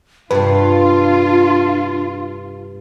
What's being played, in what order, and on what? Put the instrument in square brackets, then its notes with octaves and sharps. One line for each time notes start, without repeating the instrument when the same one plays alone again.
[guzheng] G2 C3 [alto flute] D4 [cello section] F4 [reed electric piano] B4